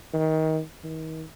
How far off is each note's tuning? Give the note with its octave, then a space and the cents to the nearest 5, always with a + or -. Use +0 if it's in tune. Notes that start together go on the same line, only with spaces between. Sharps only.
D#3 +25
D#3 +40